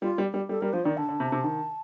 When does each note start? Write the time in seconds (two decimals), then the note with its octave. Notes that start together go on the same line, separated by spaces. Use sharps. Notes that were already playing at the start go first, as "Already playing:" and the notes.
0.02 G3 F4
0.18 G3
0.34 G3
0.49 G3 A4
0.61 G3 A#4
0.73 F3 C5
0.84 D#3 D5
0.97 D3 A5
1.09 D3
1.20 C3
1.32 C3
1.44 D#3